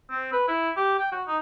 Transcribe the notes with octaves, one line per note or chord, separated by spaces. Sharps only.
C4
B4
E4
G4
G5
F#4
D#4